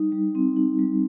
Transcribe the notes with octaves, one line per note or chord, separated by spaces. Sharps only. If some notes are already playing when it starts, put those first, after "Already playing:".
Already playing: G3 D#4
G3
C4
D#4
G3